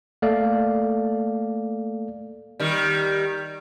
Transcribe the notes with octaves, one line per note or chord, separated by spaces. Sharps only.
A3 A#3 A4 D5 F5
D#3 G3